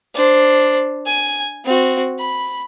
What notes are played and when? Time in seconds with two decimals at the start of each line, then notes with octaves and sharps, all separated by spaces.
0.15 D4 C5
1.06 G#5
1.65 C4 F#4
2.19 B5